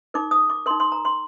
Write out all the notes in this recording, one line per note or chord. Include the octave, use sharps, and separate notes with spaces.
D#4 A#4 D6
D#6
D6
D#4 A#4 C6
C6
A#5
C6